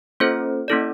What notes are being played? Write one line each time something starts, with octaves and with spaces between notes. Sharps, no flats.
A#3 C#4 F4 A4 C5
A#3 C#4 E4 A4 D5